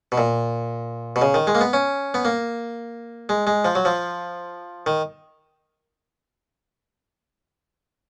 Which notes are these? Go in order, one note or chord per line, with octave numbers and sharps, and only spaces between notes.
B2
A#2
B2
C#3
D#3
G#3
A#3
B3
C#4
B3
A#3
G#3
G#3
F3
F#3
F3
D#3